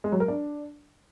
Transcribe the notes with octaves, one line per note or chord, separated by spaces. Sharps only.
G#3
F#3
A#4
D4